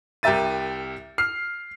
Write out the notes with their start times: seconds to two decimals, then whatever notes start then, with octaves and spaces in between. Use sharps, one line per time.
0.23 C2 G4 A#4 E5 A6 D#7
1.18 F6 C7